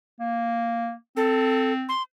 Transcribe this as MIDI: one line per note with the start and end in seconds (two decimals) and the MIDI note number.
0.20 0.93 58
1.17 1.90 60
1.17 1.72 69
1.89 2.03 84